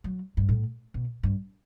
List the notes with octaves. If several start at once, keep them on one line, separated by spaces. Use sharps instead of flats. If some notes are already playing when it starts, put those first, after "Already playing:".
F#3
G2
A2
B2
G2